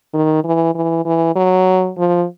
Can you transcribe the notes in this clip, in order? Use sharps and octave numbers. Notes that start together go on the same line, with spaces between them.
D#3
E3
E3
E3
F#3
F3